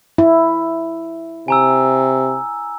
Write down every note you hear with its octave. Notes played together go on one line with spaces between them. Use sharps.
E4
C3 G#5 A#5 E6